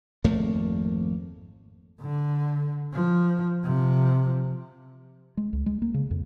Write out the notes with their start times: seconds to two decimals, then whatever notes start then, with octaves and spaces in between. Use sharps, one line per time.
0.24 G#1 F2 A3 A#3
2.01 D3
2.93 F3
3.64 C3 F3
5.37 G#3
5.53 C#2
5.66 G#3
5.82 A#3
5.94 C#3
6.11 F2